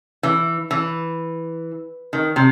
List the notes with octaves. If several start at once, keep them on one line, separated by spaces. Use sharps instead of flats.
E3
E3
D#3
C3